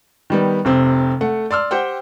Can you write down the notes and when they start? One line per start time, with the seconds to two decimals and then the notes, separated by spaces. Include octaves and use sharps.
0.30 D#3 G3 B3
0.65 F1 C3 C4
1.21 A3 F#5
1.51 D5 C6 E6 F6
1.71 G4 C5 F#5 G5